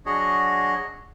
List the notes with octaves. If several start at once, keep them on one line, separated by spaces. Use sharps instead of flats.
F#3 D4 F#4 G#4 C#5 D#5